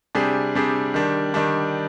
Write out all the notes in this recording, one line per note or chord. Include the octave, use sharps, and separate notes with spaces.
C3 G3 D4 G#4
C3 G3 D4 G#4
D#3 G3 D4
D#3 G3 D4